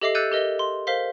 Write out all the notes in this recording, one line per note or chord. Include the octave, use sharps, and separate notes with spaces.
G4 A4 D#5 E5 D6 C7
E6 F#6 G6 A6 C#7 D#7
G4 A#4 D#5 E5 G7
C6
A#4 C5 F5 B6 G7